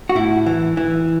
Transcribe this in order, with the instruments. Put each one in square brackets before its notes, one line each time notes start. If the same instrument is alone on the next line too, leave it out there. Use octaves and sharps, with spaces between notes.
[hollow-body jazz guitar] F#4
A2 E4
E3
E3